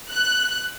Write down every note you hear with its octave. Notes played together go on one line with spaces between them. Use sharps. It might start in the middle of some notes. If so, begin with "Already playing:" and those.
F#6